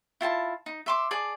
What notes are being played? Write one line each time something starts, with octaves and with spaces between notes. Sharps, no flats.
E4 F4 G#5 A5
D#4
E5 C6 D6
G#4 D5 A5